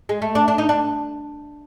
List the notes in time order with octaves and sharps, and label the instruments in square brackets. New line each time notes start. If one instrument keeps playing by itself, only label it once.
[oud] G#3
A3
D4
D4
D#4
D4